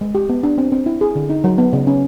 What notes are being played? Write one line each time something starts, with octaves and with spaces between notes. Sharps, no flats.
G#3
G4
B3
D4
C4
C4
E4
G#4
D3
D#4
F#3
B3
C#3
C#4